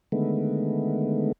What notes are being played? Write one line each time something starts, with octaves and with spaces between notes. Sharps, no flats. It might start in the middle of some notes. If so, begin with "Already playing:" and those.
D3 D#3 G#3 A3 B3